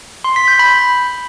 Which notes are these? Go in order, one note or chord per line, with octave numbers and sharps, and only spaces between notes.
C6
B6
G6
B5